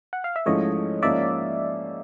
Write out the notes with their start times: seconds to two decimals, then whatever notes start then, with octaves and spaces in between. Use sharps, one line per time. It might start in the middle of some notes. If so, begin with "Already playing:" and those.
0.13 F#5
0.24 F5
0.36 E5
0.46 G#2 F3 A3 C#4 E4 C#5 D#5
1.02 G#2 F3 A#3 C#4 D5 E5